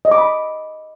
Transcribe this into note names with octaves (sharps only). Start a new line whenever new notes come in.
D#5
D6
B5